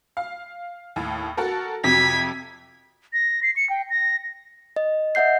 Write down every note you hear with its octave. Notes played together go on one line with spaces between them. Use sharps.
F5
D#2 A2
F#4 A4 A#4
F2 C3 F#3 G#6 B6
A#6
C7
C#7
G5
A#6
D#5
D#5 E5 F#5 G6 C7